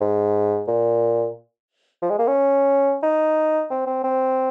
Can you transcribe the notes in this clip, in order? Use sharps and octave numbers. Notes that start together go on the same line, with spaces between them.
G#2
A#2
F3
G#3
A#3
C#4
D#4
C4
C4
C4